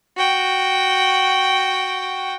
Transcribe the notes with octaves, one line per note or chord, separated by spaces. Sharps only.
F#4 G5